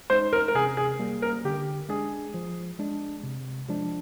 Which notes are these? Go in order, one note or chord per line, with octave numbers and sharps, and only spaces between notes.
G#3 D#4 C5
A#4
A#4
C3 G#4
G#4
G3 A#3
A#4
D3 G4
G#3 D4 G#4
F3
G#3 D4
C3
F3 G#3 D4